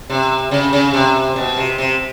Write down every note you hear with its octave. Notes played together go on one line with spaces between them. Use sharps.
C3
C#3
C#3
C3
B2
C3
C3